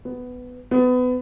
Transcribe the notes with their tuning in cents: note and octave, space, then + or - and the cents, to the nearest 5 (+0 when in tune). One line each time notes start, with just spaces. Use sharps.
B3 +10
B3 +25